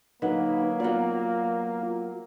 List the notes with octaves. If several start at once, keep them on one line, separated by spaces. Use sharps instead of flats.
D3 F#3 A#3 D#4 B4
F#3 B3 F4 D5